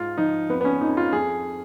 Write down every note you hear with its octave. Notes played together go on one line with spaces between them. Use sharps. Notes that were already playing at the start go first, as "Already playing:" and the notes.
Already playing: G#2 F4
F3 D#4
F2 B3
B3
C#4
F2 D#4
F4
F2 G#4